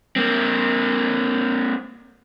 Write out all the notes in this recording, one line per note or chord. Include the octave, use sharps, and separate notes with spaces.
A#3 C4